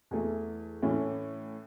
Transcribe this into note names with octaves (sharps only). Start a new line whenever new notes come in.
E2 E3 A3
A2 E3 A3 C#4